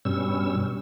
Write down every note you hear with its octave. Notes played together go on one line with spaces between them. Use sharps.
G2 B2 G3 C#4 E6